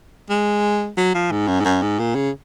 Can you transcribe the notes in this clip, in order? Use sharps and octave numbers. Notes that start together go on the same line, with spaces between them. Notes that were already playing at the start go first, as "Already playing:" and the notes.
G#3
F#3
F3
G#2
F#2
G#2
F#2
G#2
A#2
C#3